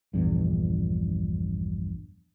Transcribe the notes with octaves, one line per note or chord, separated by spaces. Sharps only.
A#1 E2 G2